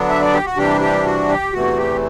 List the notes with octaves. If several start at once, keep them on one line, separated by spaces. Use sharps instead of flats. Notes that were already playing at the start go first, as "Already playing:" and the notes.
Already playing: D3 F#3 B3 D4
E5
D5
G4
F#4
C3 E3 G3 D4 G4
G4
F#4
G4
E2 C3 E3 A3 F#4
G4